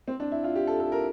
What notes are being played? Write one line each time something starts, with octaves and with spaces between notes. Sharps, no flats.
C4
D4
E4
F4
G4
A4
A4
A#4